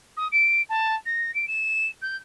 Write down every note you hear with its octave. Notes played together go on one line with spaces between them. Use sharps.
D#6
D7
A5
A#6
D7
E7
G6